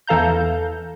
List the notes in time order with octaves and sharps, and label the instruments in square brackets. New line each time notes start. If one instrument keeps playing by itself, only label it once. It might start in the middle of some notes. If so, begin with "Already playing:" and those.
[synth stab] E2 E3 A4 F5 A#5 G6